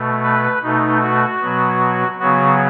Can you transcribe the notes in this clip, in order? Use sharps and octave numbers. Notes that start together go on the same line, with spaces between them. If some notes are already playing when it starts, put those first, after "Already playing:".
Already playing: B2 A3
B4
B2 A3 D#4
F#4
B2 F#3 B3
C#3 F#3 B3 F#4